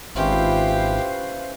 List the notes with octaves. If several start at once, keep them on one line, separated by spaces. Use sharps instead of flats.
G#1 C#4 E4 F4 G4 B4 C5 F5